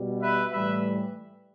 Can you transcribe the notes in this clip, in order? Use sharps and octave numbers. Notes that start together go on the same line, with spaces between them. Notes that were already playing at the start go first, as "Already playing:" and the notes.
Already playing: B2 G3
B4 E5
A2 E3 G3 B4 E5